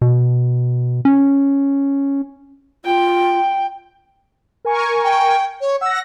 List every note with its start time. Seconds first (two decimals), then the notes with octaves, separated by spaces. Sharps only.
0.02 B2
1.05 C#4
2.85 F4 G5
4.65 A#4 G#5 C#6
5.03 G5
5.61 C#5
5.81 F#5 E6 A#6